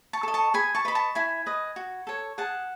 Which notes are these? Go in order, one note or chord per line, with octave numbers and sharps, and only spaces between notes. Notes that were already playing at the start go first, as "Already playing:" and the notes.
A5 C#6
A4 D#5
A5 C#6
G#4 G#5 B5
A5 C#6
B4 D#5 B5
A5 C#6
E4 G#5 B5
B4 D#5
F#4
A4 C#5
G#4 F#5 A5